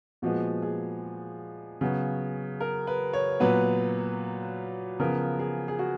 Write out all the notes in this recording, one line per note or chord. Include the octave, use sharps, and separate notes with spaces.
A#2 F3 G#3 B3 F#4
G#4
C#3 F#3 B3
A#4
B4
C#5
A#2 F#3 B3 B4
C#3 F3 B3 A#4
G#4
G#4
F#4